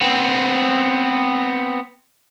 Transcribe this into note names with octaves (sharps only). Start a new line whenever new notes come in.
B3 C4